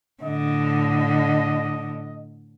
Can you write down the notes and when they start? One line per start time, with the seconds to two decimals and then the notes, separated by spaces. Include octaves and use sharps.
0.23 A2 D3 D#5